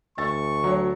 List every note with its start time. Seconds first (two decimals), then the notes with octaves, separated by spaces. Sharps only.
0.18 D2 C#6 E6 A6
0.64 F#3 C#5